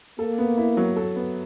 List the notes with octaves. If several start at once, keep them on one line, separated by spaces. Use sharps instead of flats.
A#3 A4
B3
E4
F#3
A4
B3